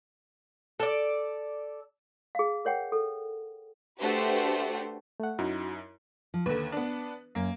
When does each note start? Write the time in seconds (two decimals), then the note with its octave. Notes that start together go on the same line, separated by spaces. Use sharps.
0.80 A4 D5
2.35 G#4 F5
2.65 A#4 C#5 F#5 G5
2.92 A4
4.00 A3 D4 F#4 G4 B4 C5
5.20 A3 F#5
5.39 F#2 D#4 E4 F#4
6.34 F3
6.46 D#2 D3 B4
6.72 B3 D4
7.35 F#2 A#3